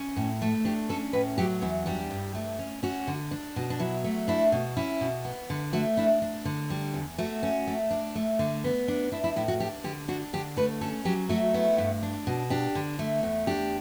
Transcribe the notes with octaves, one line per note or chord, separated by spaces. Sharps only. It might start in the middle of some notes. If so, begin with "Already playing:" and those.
Already playing: C#4
A2
A3 A4
D4 G4
C#4 A4
A2 B4
F#3 G4
E2 E4
G3 D4
G2
A3
C#4
C#4 F#4
D3
D4
B2
D4
F#3 E4
A3
D4 E4
B2
C#4 E4
B2
B3
D3
A3 F#4
D4 E4
D4
D3
G3
E2
A3 F#4
C#4
A3
D4
A3
D3
B3
D4
D4 E4
E4
A2 E4
F#4
D4 G4
D3 G4
D4 F#4
D3 G4
A3 B4
C#4 A4
F#3 G4
A3 F#4
B3 E4
G2
D4
B2
D4 G4
D3
A3
E2
D4 G4